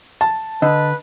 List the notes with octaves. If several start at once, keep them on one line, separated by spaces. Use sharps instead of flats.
A5
D3 B4 D#5